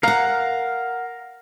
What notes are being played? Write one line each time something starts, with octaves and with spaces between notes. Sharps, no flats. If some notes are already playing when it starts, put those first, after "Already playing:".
A#4 F5 F#5 A#5